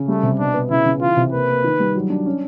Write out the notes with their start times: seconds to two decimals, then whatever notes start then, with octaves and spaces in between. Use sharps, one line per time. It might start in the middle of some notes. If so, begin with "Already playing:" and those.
Already playing: C#3
0.08 G3 A3
0.23 C3
0.39 B2 D4
0.54 B3
0.70 C#3 E4
0.86 C#3
1.01 E3 F4
1.17 C3
1.32 A#3 B4
1.49 A#3
1.64 D#3
1.80 G3
1.95 F#3
2.10 D4
2.26 C#4